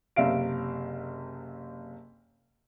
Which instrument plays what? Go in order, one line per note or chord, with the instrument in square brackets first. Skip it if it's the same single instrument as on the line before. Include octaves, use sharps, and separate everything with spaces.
[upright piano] F#1 C3 E5 F5 D7